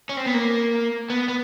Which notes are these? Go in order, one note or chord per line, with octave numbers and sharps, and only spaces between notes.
C#4
C4
B3
A#3
B3
B3